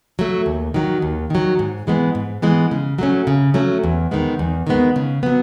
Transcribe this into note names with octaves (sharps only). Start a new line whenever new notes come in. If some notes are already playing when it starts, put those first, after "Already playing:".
F#3 A3
D#2
D#3 F#3
D#2
D#3 F#3
G#2
E3 G#3 B3
G#2
E3 G#3 B3
C#3
F#3 A3 C#4
C#3
F#3 A3 C#4
E2
D#3 G#3 B3
E2
D#3 G#3 B3
C#3
F#3 B3